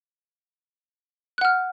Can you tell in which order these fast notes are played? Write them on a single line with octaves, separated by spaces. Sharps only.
F#6 F#5 F6